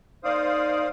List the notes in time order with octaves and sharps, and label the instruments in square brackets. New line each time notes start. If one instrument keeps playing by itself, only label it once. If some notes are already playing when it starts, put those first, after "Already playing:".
[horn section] A#3 D#4 D5 [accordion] C5 F5 D#6